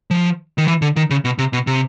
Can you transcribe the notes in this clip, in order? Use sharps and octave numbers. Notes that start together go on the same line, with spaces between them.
F3
D#3
E3
D3
D#3
C#3
B2
C3
B2
C3